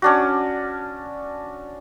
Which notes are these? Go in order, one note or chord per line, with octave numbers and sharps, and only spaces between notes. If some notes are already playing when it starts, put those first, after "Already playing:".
C#4 D4 F#4